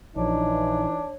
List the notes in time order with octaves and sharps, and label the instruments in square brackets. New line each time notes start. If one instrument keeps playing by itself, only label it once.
[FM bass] A#1 [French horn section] E3 D#4 [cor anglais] D4 [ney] C#5